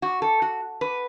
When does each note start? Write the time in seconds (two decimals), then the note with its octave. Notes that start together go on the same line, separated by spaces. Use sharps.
0.02 F#4
0.22 A4
0.42 F#4
0.81 B4